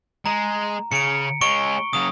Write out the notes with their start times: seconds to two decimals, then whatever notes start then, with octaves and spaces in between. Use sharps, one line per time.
0.26 G#3 A#5
0.92 C#3 C#7 D7
1.41 G#3 C#4 C#6 D7 G7
1.93 C#3 F#3 D#6